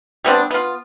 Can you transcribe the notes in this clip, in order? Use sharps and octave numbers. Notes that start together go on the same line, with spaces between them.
G3 B3 C4 D4
B3 F4